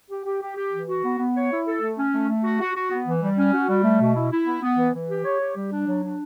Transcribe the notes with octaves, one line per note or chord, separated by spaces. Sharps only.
G4
G4
G4
G4
E3
F#4
B3
B3
C#5
E4
A4
A3
C#4
A3
A3
F#4
F#4
F#4
B3
E3
G3
C#4
F#4
G3
A3
B2
E4
E4
B3
B3
E3
E3
G4
C#5
G4
G3
D4
F#3
D4